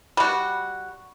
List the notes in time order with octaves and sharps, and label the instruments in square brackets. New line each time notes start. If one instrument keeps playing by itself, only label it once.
[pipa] G3 F#4